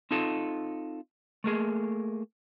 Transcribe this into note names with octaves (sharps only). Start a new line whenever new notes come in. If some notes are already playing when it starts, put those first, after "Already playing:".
C4 D#4 F4 A4
A3 A#3 G#4